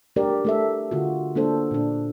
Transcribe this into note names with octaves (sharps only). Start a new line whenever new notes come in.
A3 D4 G4 A#4 D5
A3 A4 E5
D3 F4 F#4
A#3 D4 A4 C5
A#2 D4